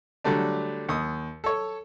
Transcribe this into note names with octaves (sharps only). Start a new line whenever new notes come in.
D3 F#3 G3 A3 D4
D#2 D#6
A4 C#5